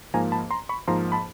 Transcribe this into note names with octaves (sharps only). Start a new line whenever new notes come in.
G#2 F3 A#3 G#5 A#5
A5 B5
A#5 C6
B5 C#6
G#2 F3 A#3 A#5 C6
A5 B5